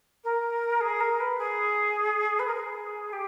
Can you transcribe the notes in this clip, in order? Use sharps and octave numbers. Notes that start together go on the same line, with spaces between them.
A#4
G#4
A#4
B4
G#4
B4
A#4
G#4
G4